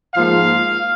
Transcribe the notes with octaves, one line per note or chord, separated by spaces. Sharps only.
G#2 F3 A#3 F5